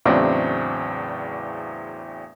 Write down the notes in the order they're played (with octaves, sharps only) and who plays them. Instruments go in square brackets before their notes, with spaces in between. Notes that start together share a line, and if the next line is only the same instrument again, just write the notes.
[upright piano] E2 A2 C#3 F#3 C4 D4